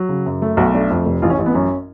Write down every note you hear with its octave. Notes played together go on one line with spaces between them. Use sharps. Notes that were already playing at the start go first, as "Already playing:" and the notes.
Already playing: F#3
C#3
F#2
A3
B1 F#4
A3 D4
F2
F1
A1 F4
C#4
A1
B3
F#2 C#4